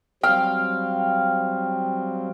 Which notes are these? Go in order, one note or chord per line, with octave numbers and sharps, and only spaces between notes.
F#3 G3 C4 F5 G5